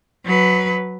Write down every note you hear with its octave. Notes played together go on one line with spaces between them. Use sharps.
F#3 B4